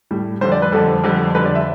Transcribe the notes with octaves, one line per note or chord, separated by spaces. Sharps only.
A2 G3
F2 D3 G3 C5
D5
B4
F2 D3 G3 A4
F2 D3 G3
F2 D3 G3 B4
D5
E5